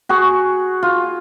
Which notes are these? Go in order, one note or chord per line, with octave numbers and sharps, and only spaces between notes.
F#4 G#4 C#6
F4